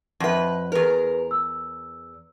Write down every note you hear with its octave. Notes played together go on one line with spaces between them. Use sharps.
F2 B4 E5 F#5 A5
E2 G#4 A#4 B4
E6